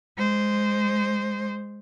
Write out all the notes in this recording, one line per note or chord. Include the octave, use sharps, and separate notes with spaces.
G#3 C5